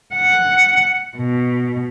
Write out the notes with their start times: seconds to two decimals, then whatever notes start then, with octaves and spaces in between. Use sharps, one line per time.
0.15 F#5
1.17 B2